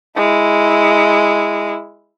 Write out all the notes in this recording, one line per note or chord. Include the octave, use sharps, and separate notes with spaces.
G#3 E4